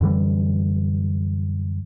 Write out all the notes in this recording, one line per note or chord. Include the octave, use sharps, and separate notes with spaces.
F#2 D3 E3 G3